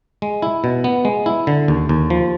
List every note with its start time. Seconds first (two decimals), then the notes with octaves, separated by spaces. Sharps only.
0.22 G#3
0.42 E4
0.64 B2
0.84 B3
1.05 G#3
1.26 E4
1.47 D3
1.68 D#2
1.89 D#2
2.10 F3